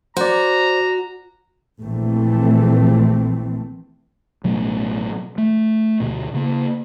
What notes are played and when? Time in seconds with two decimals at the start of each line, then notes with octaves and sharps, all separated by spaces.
0.17 F#4 C5 D5 A#5
1.82 A#1 E3 A3 C4
4.44 A1 B2 F#3 A3
5.38 A3
6.00 D2 B2
6.34 C#3 A#3